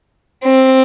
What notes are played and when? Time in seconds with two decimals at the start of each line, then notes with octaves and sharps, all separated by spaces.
0.43 C4